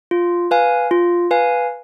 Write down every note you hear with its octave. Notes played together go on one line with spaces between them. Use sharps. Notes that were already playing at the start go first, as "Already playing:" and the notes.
F4
B4 F5 G#5
F4
B4 F5 G#5